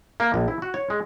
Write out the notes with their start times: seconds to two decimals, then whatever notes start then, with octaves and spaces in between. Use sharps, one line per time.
0.20 A#3
0.34 A#1
0.48 E4
0.62 F#4
0.74 C#5
0.90 G#3